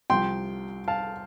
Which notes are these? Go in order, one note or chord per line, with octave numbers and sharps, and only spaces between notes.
C2 C3 F3 G5 C6
F5 A5